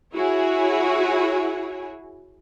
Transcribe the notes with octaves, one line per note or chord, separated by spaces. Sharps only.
E4 F#4 G#4 C#5